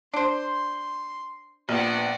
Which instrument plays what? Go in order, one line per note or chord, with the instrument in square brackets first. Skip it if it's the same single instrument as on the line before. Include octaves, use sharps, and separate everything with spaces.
[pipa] D4 C5 [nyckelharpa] C6
[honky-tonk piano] A#1 [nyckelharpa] B3 [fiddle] D5 F#5